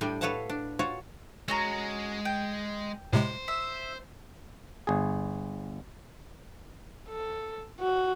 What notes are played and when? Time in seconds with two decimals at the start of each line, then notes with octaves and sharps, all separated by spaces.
0.01 A2 G3 D4 G5 G#5
0.21 A4 B4 C#5 F5 F#5 A5
0.50 D4
0.79 F4 F#4 C#5 A5
1.48 G#3 C#4 F#4 A#5
2.25 G5
3.13 A2 C3 G#3 C5
3.48 E5
4.87 G1 G#4
7.09 A4
7.80 F#4